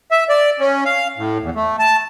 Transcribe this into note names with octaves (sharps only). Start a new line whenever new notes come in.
E5
D5
C#4
F5
A2
E2
A3
A5